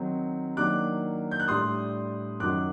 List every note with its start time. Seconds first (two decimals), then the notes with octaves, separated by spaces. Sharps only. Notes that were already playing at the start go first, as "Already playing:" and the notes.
Already playing: D#3 F#3 C4 D#4
0.57 D#3 F#3 A#3 D4 D6 F#6
1.31 G6
1.40 F#6
1.48 A2 G3 D4 C6 D#6
2.40 F#2 D#3 F#3 D6 F#6